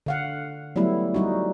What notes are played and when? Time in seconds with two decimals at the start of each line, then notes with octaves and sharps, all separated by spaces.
0.06 D3 F5 F#5
0.76 F#3 G3 A3 B3 E4
1.14 G3 D#4 F#4